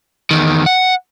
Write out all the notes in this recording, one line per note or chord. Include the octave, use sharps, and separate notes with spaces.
E2 D#3
F#5